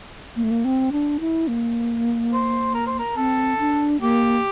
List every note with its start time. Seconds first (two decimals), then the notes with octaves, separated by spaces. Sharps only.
0.36 A#3
0.43 A3
0.51 A#3
0.65 C4
0.92 D4
1.20 E4
1.48 A#3
2.33 C5
2.74 A#4
2.87 C5
2.99 A#4
3.16 C4 A4
3.59 D4
4.01 A#3 G4